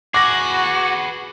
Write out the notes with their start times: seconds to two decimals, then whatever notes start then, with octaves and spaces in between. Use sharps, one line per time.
0.14 F#4 G#4 B4 D6 A#6